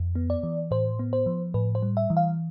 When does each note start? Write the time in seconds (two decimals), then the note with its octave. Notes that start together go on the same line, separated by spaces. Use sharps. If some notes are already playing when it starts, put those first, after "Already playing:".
Already playing: F2
0.15 B3
0.30 D5
0.43 E3
0.71 A2 C5
0.99 B3
1.13 C5
1.26 F3
1.54 A2 B4
1.75 C5
1.82 G3
1.97 E5
2.10 E3
2.17 F5